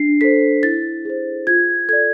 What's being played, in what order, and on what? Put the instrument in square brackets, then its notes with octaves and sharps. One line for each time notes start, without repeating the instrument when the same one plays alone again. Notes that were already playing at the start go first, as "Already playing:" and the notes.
Already playing: [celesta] D4 C7
A4 C5 B6
E4 A6
G#4 C5
F4 G#6
A4 D5 G#6